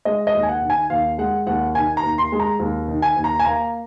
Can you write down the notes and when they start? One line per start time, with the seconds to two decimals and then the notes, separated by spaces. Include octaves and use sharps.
0.05 G#3 D#5
0.27 D#5
0.34 D#2
0.43 G#5
0.49 F#5
0.62 D#3
0.70 G#5
0.90 D#2 F5
1.18 G#3 F#5
1.47 D#2 F#5
1.75 D#3 G#5
1.97 A#5
2.03 D#2
2.18 C6
2.32 G#3
2.40 A#5
2.60 D#2
2.88 D#3
3.02 G#5
3.17 D#2
3.24 A#5
3.39 G#5
3.44 A#3 A#5